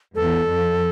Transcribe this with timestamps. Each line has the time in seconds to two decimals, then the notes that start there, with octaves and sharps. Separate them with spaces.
0.16 E2 A4
0.47 F2